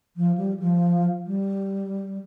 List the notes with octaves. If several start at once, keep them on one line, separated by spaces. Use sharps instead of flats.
F3
G3
F3
G3